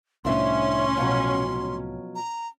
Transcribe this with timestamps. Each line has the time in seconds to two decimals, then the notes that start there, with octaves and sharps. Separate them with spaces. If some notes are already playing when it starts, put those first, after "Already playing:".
0.25 C2 F2 A2 C#4 D4 E5 C6
0.97 B2 F3 F#3
2.15 A#5